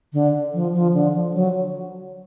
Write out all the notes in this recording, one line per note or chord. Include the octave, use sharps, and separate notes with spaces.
D3
F3
F3
D3
F3
F#3